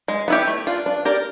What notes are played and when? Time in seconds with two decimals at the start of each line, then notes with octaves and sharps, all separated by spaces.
0.08 G#3
0.28 B3 E4 G4
0.47 A3
0.67 D4 F4
0.86 D4
1.05 G4 A#4 D5